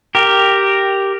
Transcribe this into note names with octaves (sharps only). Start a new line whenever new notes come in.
G4 A#4